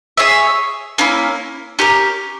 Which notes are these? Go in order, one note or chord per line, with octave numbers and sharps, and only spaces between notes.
G#4 C#5 E5
A#3 C#4 E4
C#4 G4 A#4